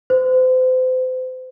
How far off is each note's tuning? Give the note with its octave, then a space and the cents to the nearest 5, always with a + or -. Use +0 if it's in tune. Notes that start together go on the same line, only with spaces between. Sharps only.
C5 -35